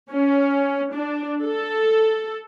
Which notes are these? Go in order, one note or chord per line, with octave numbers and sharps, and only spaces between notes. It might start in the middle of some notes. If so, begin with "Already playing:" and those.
C#4
D4
A4